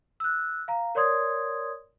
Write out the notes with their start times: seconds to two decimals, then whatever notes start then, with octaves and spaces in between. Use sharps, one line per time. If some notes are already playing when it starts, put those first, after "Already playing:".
0.20 E6 F#6
0.68 F5 A#5
0.95 A#4 C#5 D5 C6 D#6 G#6